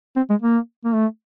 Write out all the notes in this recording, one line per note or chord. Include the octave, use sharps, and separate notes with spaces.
C4
G#3
A#3
A#3
A3